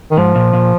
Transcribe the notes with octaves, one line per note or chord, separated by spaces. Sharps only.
D#3
G#2 F3
A#2
A#2